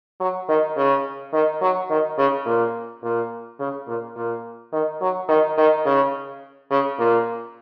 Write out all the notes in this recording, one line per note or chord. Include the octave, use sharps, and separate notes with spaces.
F#3
D#3
C#3
D#3
F#3
D#3
C#3
A#2
A#2
C#3
A#2
A#2
D#3
F#3
D#3
D#3
C#3
C#3
A#2